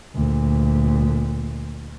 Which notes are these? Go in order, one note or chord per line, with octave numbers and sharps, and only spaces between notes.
D2 A#2